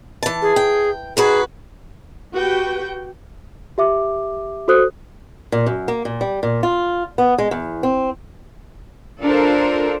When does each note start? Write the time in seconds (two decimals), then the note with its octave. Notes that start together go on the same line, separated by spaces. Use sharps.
0.23 E3 A5
0.42 G#4
0.56 G5
1.17 G#2 F#4 G#4 B4
2.33 F#4 G4 B4 G5
3.78 G4 E5 D6
4.68 F#4 A4 C5 D#6 F#6
5.52 A#2
5.67 F#2
5.88 A#3
6.05 A#2
6.21 G3
6.43 A#2
6.63 F4
7.18 B3
7.38 G#3
7.51 E2
7.83 C4
9.22 D4 F4 A4 A#4 C5